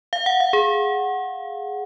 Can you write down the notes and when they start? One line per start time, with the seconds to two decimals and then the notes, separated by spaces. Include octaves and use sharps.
0.13 F5
0.26 F#5
0.40 F5
0.53 G#4